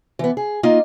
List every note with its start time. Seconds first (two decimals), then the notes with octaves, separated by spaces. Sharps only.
0.19 E3 B3
0.37 G#4
0.63 A#3 D#4 F4 D#5